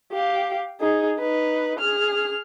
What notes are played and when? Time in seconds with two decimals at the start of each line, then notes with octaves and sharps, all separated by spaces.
0.12 G4 F5
0.80 D#4 G#4
1.18 D#4 B4
1.79 G#4 F6